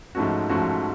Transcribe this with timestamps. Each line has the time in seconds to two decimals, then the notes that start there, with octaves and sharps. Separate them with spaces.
0.15 G#2 F3 A3 C#4 F#4
0.49 G#2 F3 A3 C#4 F#4